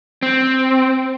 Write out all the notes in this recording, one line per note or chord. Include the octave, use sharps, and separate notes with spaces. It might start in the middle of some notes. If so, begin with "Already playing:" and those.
C4